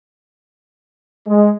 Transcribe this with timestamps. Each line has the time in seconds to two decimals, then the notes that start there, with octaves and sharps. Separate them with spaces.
1.26 G#3